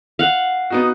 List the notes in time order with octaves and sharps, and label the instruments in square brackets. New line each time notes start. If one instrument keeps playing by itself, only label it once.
[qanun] F5 F#5
[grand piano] B3 D#4 F#4